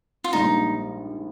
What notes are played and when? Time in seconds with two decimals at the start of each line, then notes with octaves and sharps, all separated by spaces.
0.24 F4
0.33 A#1 G#2 G3 A#3 D4 D#4